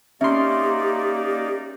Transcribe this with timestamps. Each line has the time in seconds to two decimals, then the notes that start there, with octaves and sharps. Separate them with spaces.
0.21 A#3 C#4 D#4 G4 D5 E5 C6